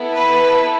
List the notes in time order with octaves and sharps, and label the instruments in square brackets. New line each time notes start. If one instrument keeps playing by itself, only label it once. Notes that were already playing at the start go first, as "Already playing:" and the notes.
Already playing: [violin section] B3 E4 A4
B4